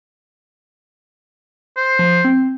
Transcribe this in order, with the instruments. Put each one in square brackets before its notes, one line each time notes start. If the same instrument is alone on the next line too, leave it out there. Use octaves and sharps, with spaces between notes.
[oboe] C5
[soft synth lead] F3
C4